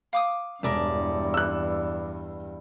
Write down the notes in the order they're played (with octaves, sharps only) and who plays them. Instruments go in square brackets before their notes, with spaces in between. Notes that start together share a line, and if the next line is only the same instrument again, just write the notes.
[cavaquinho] F5 D6 D#6
[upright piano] E1 [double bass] E2 G2 [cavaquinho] A#4 D5 E5
[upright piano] E6 F#6